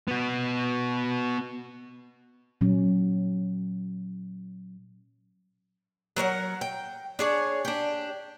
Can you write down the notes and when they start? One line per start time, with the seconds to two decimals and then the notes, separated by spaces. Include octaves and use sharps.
0.08 B3 F#4
2.61 A#2 F#3 C#4
6.16 F#3 A#4 C#5 F#5
6.61 G5
7.19 D4 G#4 C#5
7.65 D4 G4